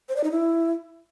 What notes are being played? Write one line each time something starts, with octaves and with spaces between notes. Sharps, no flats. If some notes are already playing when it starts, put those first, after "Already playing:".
C5
D5
D#4
E4